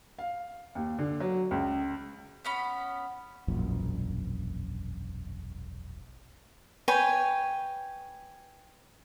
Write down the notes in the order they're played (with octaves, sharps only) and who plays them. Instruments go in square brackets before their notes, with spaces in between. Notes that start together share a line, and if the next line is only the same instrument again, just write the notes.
[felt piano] F5
D#2
D3
F#3
C#2
[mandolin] B3 C#4 B5
[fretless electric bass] E1 A#1 F#2 A#2
[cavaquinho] B4 C#5 G5 G#5